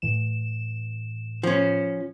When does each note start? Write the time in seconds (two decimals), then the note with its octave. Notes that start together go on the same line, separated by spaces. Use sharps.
0.02 A2 E3 E7
1.43 F3 C#4